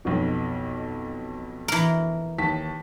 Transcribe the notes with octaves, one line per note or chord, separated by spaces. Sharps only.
B1 F2 B2
E3 A#4
D#2 A5 B6